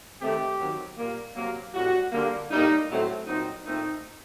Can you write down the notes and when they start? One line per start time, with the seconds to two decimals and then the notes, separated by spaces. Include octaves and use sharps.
0.20 C3 D#3 A3 C4 G4
0.59 D#3 F#3 C4
0.97 A#2 G3 A#3
1.35 C3 F#3 A#3
1.74 A2 G3 C4 F#4
2.12 D3 G3 A#3
2.50 A2 G3 A#3 D#4
2.88 A2 F#3 A3 C4
3.27 A#2 F#3 C4 D#4
3.65 A#2 A3 C4 D#4